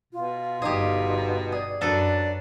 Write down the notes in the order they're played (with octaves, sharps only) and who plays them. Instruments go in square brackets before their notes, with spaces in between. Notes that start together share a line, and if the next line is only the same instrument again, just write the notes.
[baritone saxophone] B2 [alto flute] F4
[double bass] G1 D#4 [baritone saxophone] B2 [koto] G4 G#4
[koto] G#4 [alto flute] D5
[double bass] F#2 [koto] F#3 A4 B4 [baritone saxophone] D4